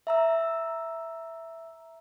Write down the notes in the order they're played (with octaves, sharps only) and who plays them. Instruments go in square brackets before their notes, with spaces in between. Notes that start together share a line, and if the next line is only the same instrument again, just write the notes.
[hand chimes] E5 A#5 E6